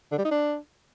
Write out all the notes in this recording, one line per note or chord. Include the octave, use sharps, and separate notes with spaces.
D3
G3
D#4
D4